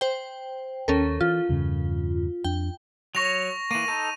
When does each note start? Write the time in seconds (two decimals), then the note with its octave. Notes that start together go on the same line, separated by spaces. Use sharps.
0.01 C5 G5
0.88 D#2 C#4 A4 A#4
1.21 E3 F4
1.49 E2 G2 C#3
2.44 F2 D4 G5
3.15 F#3 C#5 C#6 A#6 F7
3.71 E3 A#3 D#7
3.88 D#4 A4